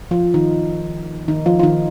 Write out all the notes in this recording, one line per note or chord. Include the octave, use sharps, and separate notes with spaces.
F3 F4
D#3 D#4
D#3 D#4
F3 F4
F4
D#3 D#4